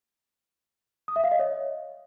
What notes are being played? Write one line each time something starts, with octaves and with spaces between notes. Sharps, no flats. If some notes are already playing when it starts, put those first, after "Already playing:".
D#6
E5
F5
D#5
C#5